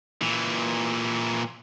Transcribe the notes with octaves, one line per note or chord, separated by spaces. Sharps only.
A#2 E3